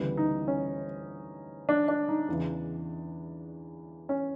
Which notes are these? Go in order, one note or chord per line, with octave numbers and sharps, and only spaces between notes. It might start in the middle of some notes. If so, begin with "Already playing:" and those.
Already playing: D2 C#3 E3 G3 B3
D#4
C#4
D4
D4
D#4
E2 C#3 E3
C#4